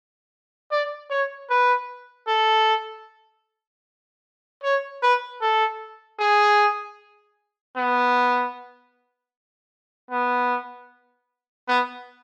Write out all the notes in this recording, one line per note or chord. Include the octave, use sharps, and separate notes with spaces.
D5
C#5
B4
A4
C#5
B4
A4
G#4
B3
B3
B3